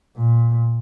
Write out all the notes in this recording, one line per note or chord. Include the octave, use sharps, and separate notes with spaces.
A#2